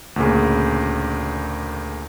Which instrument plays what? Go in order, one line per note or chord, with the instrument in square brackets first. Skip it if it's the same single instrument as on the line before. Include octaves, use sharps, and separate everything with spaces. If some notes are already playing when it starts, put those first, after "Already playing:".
[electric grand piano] D2 A#2 C#3